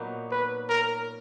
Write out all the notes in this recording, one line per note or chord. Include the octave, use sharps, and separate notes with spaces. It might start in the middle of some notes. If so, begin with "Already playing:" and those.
Already playing: A#2 F#3 B3 D#4
B4
A#4